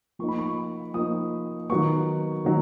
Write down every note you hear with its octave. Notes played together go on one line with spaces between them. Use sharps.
F3 A#3 D#4 C#6
B5
C#6
F3 A#3 D#4 D#6
D#3 F#3 B3 C#6
D#3 F#3